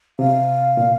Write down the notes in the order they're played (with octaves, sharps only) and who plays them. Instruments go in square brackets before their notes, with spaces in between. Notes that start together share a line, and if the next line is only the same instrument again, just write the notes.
[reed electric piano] C3 [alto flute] F5
[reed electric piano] A#2